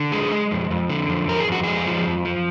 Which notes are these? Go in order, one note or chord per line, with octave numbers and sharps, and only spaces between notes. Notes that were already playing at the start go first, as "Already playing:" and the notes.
Already playing: D3
G#3 G#4
G#3
F2
F2
D3
F2
F2 A#4
G#4
F2 F#4
G#3 G#4
F3
F2
F3